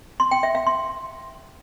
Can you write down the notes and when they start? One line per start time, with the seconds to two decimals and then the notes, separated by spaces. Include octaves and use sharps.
0.20 C6
0.31 G5
0.43 E5
0.55 F5
0.67 C6